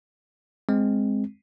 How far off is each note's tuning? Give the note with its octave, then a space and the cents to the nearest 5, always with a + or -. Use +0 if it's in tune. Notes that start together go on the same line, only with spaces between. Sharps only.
G#3 +0 C4 +0